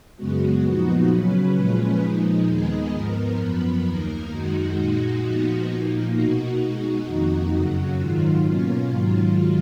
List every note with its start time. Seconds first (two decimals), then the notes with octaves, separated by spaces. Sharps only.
0.16 F#2 C#3 G#3 B3 F#4
0.63 A#2 F3 B3 D#4
1.09 C#3 F#3 C#4 B4
1.54 A#2 F3 G#3 C#4
2.00 A#2 F3 G#3 D#4
2.46 D#2 D#3 G#3 B3 D#4 G#4
2.93 G#2 F3 B3 A#4
3.38 F#2 F3 B3 B4
3.84 D#2 D#3 A#3 A#4
4.30 F#2 D#3 G#3 D#4 F#4
4.76 A#2 G#3 D#4 F#4
5.22 A#2 F3 B3 D#4
5.69 A#2 F3 A#3 D#4
6.15 B2 A#3 D#4 F#4
6.61 B2 G#3 D#4
7.06 F2 D#3 A#3 D#4
7.53 F#2 C#3 F#3
7.99 G#2 D#3 F#3 F4
8.44 B2 A#3 C#4
8.90 G#2 D#3 F#3